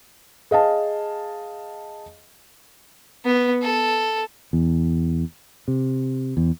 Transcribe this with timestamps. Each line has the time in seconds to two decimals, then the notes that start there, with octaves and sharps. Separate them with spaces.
0.51 G#4 D#5 F5 A5
3.25 B3
3.63 A4
4.53 E2
5.68 C3
6.37 E2